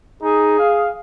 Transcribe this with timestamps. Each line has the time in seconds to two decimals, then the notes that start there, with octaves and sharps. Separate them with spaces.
0.22 D#4 G#4
0.59 F5